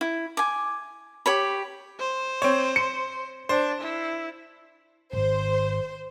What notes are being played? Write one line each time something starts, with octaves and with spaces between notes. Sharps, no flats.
E4
G#5 D6
G4 C#5 B5
C5
C4 C#5
C#7
D4 C5
E4
D1 G#1 C5